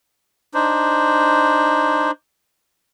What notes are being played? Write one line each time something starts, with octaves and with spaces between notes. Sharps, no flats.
D4 D#4 C5